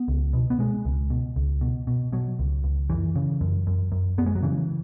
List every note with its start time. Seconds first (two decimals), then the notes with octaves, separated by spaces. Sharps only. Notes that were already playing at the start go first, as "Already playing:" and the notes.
Already playing: B3
0.08 C#2
0.33 B2
0.50 B3
0.59 B2 G#3
0.85 C#2
1.10 B2
1.36 C#2
1.61 B2
1.87 B2
2.12 B2 F#3
2.39 C#2
2.64 C#2
2.90 F#2 E3
3.16 C#3
3.41 F#2
3.67 F#2
3.92 F#2
4.18 F#2 B3
4.26 G#3
4.35 F#3
4.43 C#3 E3